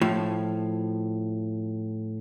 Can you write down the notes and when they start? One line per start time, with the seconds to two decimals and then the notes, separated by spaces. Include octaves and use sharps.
0.01 A2 F3